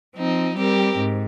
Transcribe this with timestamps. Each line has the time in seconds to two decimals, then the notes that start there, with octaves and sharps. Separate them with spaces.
0.15 F3 C4 D#4
0.55 G3 C4 G4 A#4
0.97 G#2